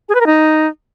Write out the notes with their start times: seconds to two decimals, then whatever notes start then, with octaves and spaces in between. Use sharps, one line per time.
0.09 G#4
0.15 B4
0.21 A#4
0.26 D#4